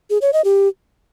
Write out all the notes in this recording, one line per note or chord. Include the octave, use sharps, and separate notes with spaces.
G#4
C#5
D#5
G4